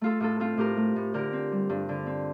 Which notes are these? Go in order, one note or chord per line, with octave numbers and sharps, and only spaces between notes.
A3 F4 A4
A2 F4 A4
C4 F4 A4
A2 G4 A#4
A3
A2
D3 G4 A#4
C4
G3
G2
D3
C4